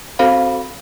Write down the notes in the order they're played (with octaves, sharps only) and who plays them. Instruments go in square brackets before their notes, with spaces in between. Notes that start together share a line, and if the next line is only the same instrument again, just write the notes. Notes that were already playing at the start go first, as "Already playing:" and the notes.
[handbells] C4 F#4 A4 C5 F5 B5